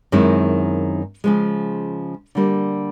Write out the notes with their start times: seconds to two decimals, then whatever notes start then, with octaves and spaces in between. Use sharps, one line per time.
0.12 F#2 D#3 G#3 C4 E4
1.24 C#3 F3 G#3
2.35 D3 G3 A#3